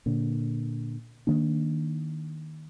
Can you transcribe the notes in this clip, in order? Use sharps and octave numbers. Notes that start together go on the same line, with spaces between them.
A#2 D3
D#3 A#3 D4